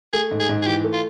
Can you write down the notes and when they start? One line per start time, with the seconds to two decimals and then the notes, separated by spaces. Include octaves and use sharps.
0.13 A3 G#4
0.31 G#2
0.40 G#4
0.49 G#2
0.62 G#4
0.66 E3 G4
0.84 A3
0.93 F4